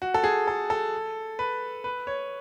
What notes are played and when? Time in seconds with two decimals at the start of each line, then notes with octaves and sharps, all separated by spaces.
0.02 F#4
0.14 A4
0.24 G#4
0.47 A4
0.70 A4
1.39 B4
1.84 B4
2.07 C#5